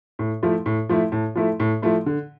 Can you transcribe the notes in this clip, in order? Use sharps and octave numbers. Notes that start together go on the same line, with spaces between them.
A2
F3 A3 E4
A2
F3 A3 E4
A2
F3 A3 E4
A2
F3 A3 E4
D3